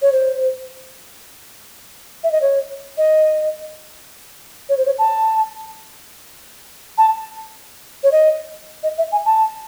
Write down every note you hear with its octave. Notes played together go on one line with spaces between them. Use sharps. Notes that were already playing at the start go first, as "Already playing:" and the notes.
C#5
C5
E5
D#5
C#5
D#5
C#5
C5
C#5
A5
A5
C#5
D#5
D#5
E5
G#5
A5